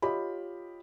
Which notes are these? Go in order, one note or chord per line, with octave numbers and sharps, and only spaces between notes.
F4 G4 C#5 D#5 B5